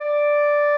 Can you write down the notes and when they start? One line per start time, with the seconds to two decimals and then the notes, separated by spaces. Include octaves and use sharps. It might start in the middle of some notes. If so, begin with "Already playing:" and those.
0.01 D5